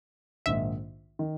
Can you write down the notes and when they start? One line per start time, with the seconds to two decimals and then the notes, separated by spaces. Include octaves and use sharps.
0.46 A#1 G#2 D#3 E5
1.19 D#3